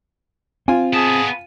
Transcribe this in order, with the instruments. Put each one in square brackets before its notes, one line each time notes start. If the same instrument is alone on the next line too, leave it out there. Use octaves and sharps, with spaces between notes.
[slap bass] C4 [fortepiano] F4 G#5
[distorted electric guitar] B3 A5 [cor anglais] G#4